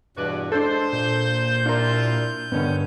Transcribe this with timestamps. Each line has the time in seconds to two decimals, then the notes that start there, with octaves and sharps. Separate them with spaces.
0.17 E2 G2 B2 F#4 B4 D5
0.52 G#3 D4 A4 C5
0.93 A#2 G6
1.66 G3 D4 E4 F4 A#4
2.52 G2 D3 D#3 B3 C#4